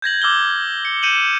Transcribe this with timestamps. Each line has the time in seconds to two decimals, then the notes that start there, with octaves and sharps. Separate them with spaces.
0.02 G6 G#6 A#6 F#7
0.22 D6 E6 F6 G#6 G7
0.85 C#7
1.03 G6 C#7 D#7 E7 F#7